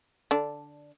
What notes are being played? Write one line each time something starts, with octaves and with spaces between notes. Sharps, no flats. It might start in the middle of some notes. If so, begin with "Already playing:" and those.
D3 D4